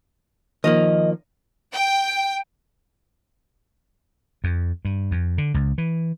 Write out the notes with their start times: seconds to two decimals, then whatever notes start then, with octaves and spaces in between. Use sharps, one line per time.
0.64 D#3 F3 A#3 D#5
1.73 G5
4.44 F2
4.85 G2
5.11 F2
5.38 D3
5.54 C#2
5.78 E3